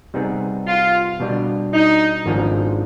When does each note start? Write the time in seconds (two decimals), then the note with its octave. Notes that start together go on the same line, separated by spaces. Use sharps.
0.14 C3 G3 B3 D#4 G#4
0.67 F4
1.20 B2 G3 D4
1.73 D#4
2.26 G#1 G#2 F3 G#3 D4